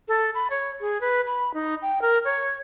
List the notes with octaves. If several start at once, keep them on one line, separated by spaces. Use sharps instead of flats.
A4
B5
C#5
G#4
B4
B5
D#4
G5
A#4
C#5